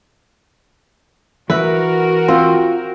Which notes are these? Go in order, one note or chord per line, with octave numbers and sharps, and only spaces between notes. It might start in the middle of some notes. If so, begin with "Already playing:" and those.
E3 F#4 A#4 B4 E5
C4 F4